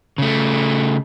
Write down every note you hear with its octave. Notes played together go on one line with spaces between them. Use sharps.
C#3 A3